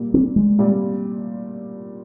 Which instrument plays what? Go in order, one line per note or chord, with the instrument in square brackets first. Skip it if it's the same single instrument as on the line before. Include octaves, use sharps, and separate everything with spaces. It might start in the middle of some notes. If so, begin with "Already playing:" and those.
Already playing: [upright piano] A#2 G3 A#3
[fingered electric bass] C4
G#3
[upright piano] A#2 G3 A#3 F4